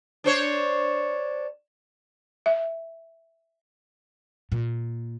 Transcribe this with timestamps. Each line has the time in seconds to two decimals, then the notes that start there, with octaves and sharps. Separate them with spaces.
0.24 D4 C5 C#5
2.46 E5
4.52 A#2